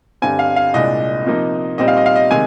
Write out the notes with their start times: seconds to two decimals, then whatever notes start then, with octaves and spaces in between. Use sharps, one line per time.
0.22 G2 D3 G3 C4 G#5
0.39 F5
0.56 F5
0.74 C2 A#2 G#3 D4 D#5
1.27 C3 F3 A#3 D#4
1.78 A#2 G3 C4 D#4 D#5
1.88 F5
1.97 D#5
2.06 F5
2.16 D#5
2.31 C3 D#3 G#3 G#5